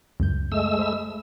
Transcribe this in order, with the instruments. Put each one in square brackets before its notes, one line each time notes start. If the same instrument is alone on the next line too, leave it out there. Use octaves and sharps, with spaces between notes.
[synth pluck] C#2 F#2 G6
[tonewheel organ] G#3 A3 E6
[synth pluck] C5 B5